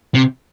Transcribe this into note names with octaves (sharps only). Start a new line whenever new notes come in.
C3